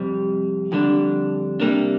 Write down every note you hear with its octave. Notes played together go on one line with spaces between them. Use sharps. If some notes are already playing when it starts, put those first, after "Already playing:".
Already playing: F2 C3 G3
F2 D3 G3 D4
C3 G3 A#3 D4